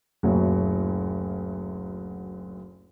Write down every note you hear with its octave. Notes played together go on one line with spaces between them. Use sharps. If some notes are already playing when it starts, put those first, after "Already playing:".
F#1 D2 A#2 F#3